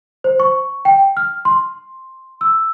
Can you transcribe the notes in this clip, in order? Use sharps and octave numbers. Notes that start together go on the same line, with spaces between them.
C5
C#6
G5
F6
C6
E6